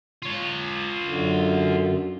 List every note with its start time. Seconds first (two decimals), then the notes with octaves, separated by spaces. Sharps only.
0.22 F4 C#5
1.02 F#2 D3